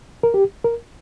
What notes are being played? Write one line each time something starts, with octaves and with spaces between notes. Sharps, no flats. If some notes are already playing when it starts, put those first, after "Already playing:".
A#4
G4
A#4